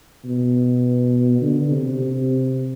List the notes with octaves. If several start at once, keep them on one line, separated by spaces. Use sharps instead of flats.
B2
D3
C3
C3